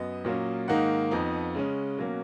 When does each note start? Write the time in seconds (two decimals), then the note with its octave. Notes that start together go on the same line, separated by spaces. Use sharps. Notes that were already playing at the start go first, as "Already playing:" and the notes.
Already playing: F#2 B3 D#5
0.25 A#2 F#3 A#3 C#4
0.68 G#2 D#3 A#3 D#4 F#5
1.11 F2 F3 B3 D#4
1.55 C#3 G#3 C#4
1.98 B2 F#3 A#3 C#4